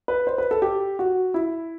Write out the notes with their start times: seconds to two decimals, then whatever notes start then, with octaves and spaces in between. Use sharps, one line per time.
0.08 B4
0.27 C5
0.38 B4
0.51 A4
0.62 G4
0.99 F#4
1.34 E4